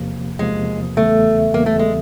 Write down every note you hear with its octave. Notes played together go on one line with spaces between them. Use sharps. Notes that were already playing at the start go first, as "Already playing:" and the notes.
Already playing: E2 C3 F3 A#3
E2 C3 F3 G#3 A#3
E2 C#3 E3 G3 A3 B3
E2 C#3 E3 G3 A#3 B3
A3
G#3